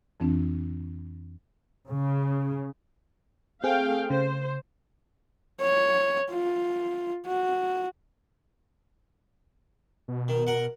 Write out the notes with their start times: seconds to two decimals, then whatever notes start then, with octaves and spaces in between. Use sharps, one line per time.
0.20 F2 E3 C4 D4
1.90 C#3
3.64 A3 C4 G#4 F5 G5
4.10 C#3 C5
5.61 C#5
6.31 F4
7.26 F#4
10.08 B2
10.28 D#3
10.47 A#4 F#5